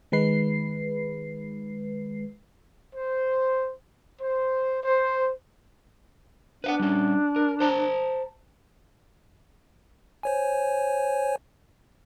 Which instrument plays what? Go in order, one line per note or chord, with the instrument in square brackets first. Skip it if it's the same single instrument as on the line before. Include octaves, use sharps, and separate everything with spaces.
[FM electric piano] D#3 G#3 B4 C7
[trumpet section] C5
C5
C5
[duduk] D4 [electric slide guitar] B4 F5 F#5
[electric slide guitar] G3 C#4
A#4
C5 A5 A#5
[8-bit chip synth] C5 C#5 G#5